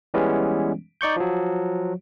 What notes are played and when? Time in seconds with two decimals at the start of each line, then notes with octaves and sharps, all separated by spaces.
0.14 E3 G3 G#3 B3 C#4
1.01 D#4 D5 C#6 G6
1.16 F3 F#3